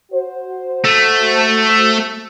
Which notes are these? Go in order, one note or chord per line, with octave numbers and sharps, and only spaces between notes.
F#4 C5
A3